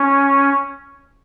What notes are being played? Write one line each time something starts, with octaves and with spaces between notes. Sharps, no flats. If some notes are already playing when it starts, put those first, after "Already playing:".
Already playing: C#4